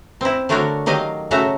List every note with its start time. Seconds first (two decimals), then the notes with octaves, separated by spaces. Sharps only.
0.21 C4 E4
0.49 D3 A3 D4 F#4 A#4 C#5
0.86 D#3 F#3 G4 D#5 F5
1.31 A2 C#3 A3 F#4 E5 A#5